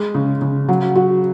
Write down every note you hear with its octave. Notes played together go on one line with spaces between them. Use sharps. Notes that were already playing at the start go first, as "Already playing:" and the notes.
Already playing: G#3
C#3
C#3
F#3
F#4